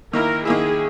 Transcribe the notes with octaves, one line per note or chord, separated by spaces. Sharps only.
D#3 A#3 E4 A#4
D#3 A#3 E4 G#4